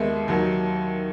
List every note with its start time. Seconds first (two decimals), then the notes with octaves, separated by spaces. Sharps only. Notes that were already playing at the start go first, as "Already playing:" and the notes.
Already playing: D#2 D#3 G#3 B3 E5
0.28 D#2 D#3 F#3